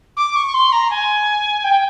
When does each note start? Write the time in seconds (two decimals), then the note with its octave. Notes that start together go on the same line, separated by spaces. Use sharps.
0.16 D6
0.35 C#6
0.47 C#6
0.54 C6
0.72 A#5
0.90 G#5
1.64 G5